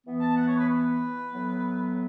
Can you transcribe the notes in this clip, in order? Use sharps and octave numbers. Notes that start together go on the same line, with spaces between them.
E3 B3
A5
F#5
C#5
B4
B4
A2 F#3 B3